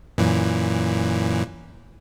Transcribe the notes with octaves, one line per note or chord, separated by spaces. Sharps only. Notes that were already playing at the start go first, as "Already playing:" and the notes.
F#2 A#2 E3